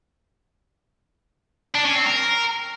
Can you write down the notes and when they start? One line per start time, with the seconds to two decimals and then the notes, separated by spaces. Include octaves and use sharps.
1.75 D4
1.85 C#4
1.95 C4
2.06 A#4